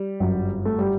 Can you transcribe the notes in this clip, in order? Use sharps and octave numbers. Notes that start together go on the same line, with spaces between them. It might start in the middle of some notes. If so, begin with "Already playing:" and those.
Already playing: G3
G1 F#2 F#3
A3
G3